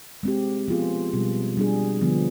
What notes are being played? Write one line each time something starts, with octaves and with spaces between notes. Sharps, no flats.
G#3 C4 G4
F3 B3 F4 G#4
B2 G3 B3
G3 D4 G#4
D3 F3 B3